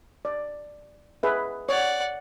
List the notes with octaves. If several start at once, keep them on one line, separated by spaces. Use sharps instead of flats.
D5
G#4 B4 E5
C#5 D5 F#5